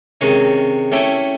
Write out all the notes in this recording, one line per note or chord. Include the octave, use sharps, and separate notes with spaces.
C3 D#3 G#3 C#4
A3 C#4 E4 G4